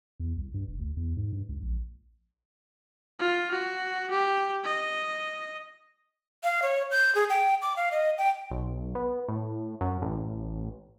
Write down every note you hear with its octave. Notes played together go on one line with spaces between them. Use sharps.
E2
C2
G2
F1
D2
E2
G#2
G2
C#2
A#1
F4
F#4
G4
D#5
F5
C#5
G6
G#4
G5
D6
F5
D#5
G5
B1
B3
A2
F#2
A1